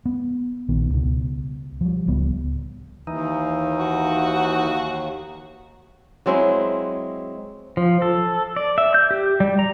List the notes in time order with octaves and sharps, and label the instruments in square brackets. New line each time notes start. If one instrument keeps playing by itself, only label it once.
[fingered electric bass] B3
A#1 D#3 B3
C#2 B2
F3 G3
D1 C#2 G3 B3
[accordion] D#2 [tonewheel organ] E3 D#4
[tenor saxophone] F#4
[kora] F#3 G#3 C4 E4
[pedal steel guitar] F3
A4
D5
E5
G6
G4
G3
A#5